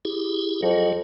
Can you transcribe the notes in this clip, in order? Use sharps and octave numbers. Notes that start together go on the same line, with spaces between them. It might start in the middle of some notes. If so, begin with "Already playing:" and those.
E4 G4 G#4
F2 F#3 G#4